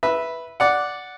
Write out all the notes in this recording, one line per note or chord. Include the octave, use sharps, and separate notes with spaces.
B4 E5
D5 F#5